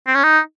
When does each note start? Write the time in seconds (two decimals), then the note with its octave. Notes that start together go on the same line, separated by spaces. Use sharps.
0.07 C4
0.15 C#4
0.23 D#4